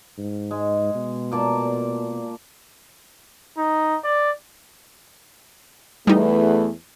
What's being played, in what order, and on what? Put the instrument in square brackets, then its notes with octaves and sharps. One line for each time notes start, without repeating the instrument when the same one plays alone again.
[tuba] G#2
[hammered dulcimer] G#3
[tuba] B2
[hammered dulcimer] A#2 D5 A5
[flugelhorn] D#4
D5
[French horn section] E2 A3 B4 [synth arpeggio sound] G3 D#4